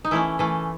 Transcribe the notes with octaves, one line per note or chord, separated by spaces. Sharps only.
D#4
E3 A3 C#4 E4
E3 A3 C#4